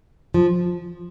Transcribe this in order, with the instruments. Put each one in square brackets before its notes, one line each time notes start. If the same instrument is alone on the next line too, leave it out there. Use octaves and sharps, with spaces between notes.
[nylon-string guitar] F3